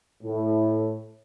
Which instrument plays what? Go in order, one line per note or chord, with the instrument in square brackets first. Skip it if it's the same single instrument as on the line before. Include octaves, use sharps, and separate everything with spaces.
[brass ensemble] A2